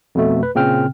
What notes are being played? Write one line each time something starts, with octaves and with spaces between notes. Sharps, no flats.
F2 B2 A3
B4
A#2 C#3 C4 G5 F6